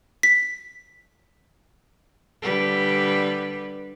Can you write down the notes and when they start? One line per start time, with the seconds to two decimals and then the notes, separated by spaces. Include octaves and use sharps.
0.23 B6
2.42 D3 G3 B4